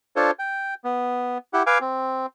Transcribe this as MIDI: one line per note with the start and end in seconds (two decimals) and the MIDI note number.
0.16 0.31 62
0.16 0.31 65
0.16 0.31 69
0.16 0.31 72
0.16 0.31 73
0.39 0.74 79
0.84 1.38 59
1.53 1.63 64
1.53 1.63 67
1.53 1.63 78
1.66 1.78 71
1.66 1.78 77
1.66 1.78 80
1.66 1.78 86
1.81 2.26 60